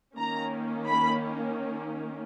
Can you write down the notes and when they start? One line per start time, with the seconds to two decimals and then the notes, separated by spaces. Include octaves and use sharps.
0.17 D#3 A#3 C#4 A#5
0.86 B5